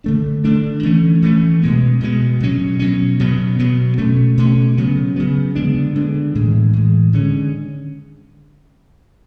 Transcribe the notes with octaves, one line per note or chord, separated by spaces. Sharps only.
D3 A3 D4
D3 A3 D4
E3 A3 C#4
E3 A3 C#4
B2 G#3 B3
B2 G#3 B3
B2 F#3 C#4
B2 F#3 C#4
B2 F#3 B3
B2 F#3 B3
B2 A3 C#4
B2 A3 C#4
C#3 F#3 B3
C#3 F#3 B3
D3 G#3 B3 D4
D3 G#3 B3 D4
A2 E3 G#3
A2 E3 G#3
D3 G#3 C#4